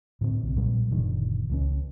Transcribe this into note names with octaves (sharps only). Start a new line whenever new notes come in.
A2 D3 C4
B1 B2
A#2 F#3 G3
F#1 A#2 D3 D#3
C#2 G#3 C#4